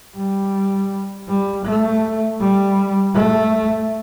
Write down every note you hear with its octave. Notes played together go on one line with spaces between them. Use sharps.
G3
G3
A3
G3
A3